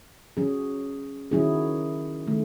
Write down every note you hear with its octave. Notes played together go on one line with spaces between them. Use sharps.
F#3 C#4 G#4
D#3 F#3 C#4 E4 G#4
D#3 A3